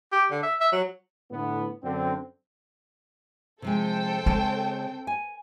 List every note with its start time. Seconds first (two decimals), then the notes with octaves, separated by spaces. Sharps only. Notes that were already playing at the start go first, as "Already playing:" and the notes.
0.12 G4
0.31 D3
0.43 E5
0.61 E5
0.72 F#3
1.32 A2 D3 B3
1.83 F#2 D3 C4
3.62 C3 F3 G#3 A4 C5 G5
4.26 C#3 G#3 C4 A5
5.07 G#5